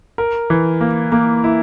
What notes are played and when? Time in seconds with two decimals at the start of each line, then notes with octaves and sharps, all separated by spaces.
0.18 A#4
0.50 E3
0.81 A#3
1.12 A#3
1.44 E4